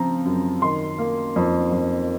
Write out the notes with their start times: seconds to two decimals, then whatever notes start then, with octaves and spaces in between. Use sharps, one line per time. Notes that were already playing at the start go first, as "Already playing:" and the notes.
Already playing: C#3 F3 C4 A#5
0.25 F#2
0.62 D#3 C6
0.98 A#3
1.36 F2
1.72 F2